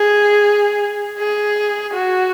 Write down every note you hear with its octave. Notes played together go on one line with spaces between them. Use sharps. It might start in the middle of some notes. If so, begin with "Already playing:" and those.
Already playing: G#4
G#4
F#4